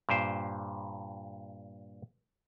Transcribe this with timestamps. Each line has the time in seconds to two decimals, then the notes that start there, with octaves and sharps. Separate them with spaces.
0.09 G2 A#2 G4 C5